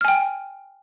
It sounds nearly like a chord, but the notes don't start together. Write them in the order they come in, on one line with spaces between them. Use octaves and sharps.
F6 G#5 G5